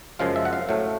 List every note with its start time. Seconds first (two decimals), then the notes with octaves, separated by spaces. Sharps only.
0.19 F#2 C#3 F3 G#3 F5
0.36 E5
0.45 F#5
0.53 F5
0.69 A2 F#3 A3